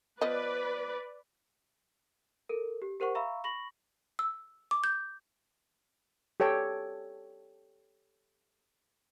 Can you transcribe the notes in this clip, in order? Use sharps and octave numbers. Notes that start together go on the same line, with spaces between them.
F3 B3 B4 D5 D#5
A4 A#4
G4
G4 A#4 C5 F#5 C#6
E5 F5 A#5 B5 C#6 E6
B5 C#6 A#6 F#7
E6
D6
G6
G4 A4 C#5 G5 A5